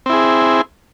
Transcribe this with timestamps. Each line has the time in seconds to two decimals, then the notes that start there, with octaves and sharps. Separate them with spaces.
0.06 C4
0.09 E4
0.13 G#4